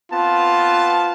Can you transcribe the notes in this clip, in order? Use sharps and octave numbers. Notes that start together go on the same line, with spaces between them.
B3 C4 F4 A5